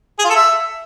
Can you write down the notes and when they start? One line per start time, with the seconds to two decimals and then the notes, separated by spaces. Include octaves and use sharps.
0.19 G#4
0.25 F4
0.30 A4
0.35 E5